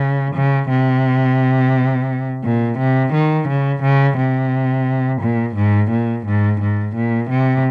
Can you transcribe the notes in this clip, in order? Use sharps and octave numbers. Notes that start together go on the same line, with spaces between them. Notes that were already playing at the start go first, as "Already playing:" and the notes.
Already playing: C#3
C#3
C3
A#2
C3
D#3
C#3
C#3
C3
A#2
G#2
A#2
G#2
G#2
A#2
C3